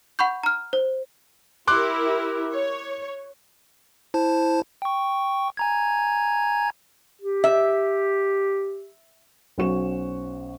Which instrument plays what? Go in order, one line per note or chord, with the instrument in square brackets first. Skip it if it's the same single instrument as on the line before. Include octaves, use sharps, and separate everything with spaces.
[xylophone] F#5 B5 C#6 G6
A#5 F6
C5
[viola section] E4 G4 A#4 [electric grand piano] C6 D6 F#6
[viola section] C#5
[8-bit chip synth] E4 C5 A5
G5 C#6
G#5 A#5 G#6
[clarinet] G4
[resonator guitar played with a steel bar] E5
[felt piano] B1 C#4 F#4 C5 C#6 E7